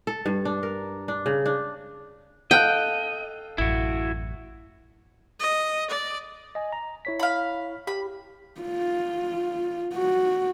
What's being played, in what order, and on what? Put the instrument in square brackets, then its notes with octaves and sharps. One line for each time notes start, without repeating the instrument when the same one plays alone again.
[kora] A4
G2
D4
A#4
D4
C#3
D4
[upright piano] A4 F5 F#6 [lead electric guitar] D#5 [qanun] G5
[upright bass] A1 F#2 [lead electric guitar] E4 F#4
[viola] D#5
D5
[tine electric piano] D#5 G#5
A#5
E4 C#5 B6
[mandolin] F5 B5
[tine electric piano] G4 [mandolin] B5
[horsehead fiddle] F4
F#4